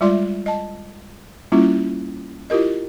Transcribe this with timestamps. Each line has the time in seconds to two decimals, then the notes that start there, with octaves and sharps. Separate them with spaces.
0.01 G3 G#3 F4 D5 E5 C6
0.46 D#5 A5
1.52 G3 A#3 C#4 E4 F4
2.50 E4 F4 G4 A#4 D#5